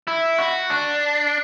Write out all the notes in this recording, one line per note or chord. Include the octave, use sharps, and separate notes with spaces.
E4
F#4
D4